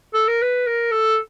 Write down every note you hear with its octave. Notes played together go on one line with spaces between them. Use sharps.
A4
A#4
B4
A#4
A4